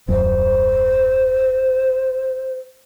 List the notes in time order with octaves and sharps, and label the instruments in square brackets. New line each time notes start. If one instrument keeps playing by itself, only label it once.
[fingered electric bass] D#1 F#2 [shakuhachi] C5